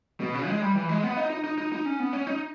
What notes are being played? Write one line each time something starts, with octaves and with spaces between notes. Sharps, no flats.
B2
C#3
G#3
G3
E3
G#3
B3
D#4
D#4
D#4
D#4
D#4
C#4
B3
C#4
D#4